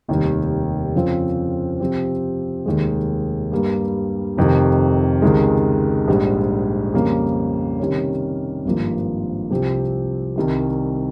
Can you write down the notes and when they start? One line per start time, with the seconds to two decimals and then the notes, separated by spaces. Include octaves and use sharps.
0.08 F1 D#2 D#3 G3
0.95 F2 C#3 F3 C4 F4
1.80 C3 F3 C4 G4
2.66 F1 D#2 D#3 G#3
3.52 G2 G3 A#3
4.37 F1 F2 C3 D#3
5.22 C#2 C3 D#3 G#3
6.08 A#1 G#2 G3
6.94 F2 C#3 G3 A#3
7.80 C3 D#3 G3 C#4
8.65 G#1 G2 F3 A#3
9.50 C2 C3 F3 C4 G4
10.36 C2 C3 D#3 G3